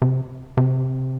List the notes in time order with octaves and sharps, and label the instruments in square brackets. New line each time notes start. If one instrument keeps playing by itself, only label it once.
[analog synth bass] C3
C3